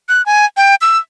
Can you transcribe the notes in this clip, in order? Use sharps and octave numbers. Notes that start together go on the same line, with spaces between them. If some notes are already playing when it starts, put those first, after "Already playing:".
F#6
G#5
G5
E6